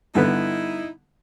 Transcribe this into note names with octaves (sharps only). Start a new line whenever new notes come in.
G2 D3 B3 D#4 E4